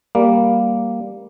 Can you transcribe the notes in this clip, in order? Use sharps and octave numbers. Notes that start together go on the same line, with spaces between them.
G3 A#3